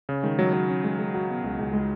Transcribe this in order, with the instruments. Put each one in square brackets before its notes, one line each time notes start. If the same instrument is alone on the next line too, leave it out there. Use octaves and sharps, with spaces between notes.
[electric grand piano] C#3 [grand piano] C#4
[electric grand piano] D#3 [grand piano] G#3
[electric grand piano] F#3 [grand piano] G#3
[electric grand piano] F#3 [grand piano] F#4
[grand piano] C#4
G#3
G#3
F#4
B2
C#2
C#2
G#3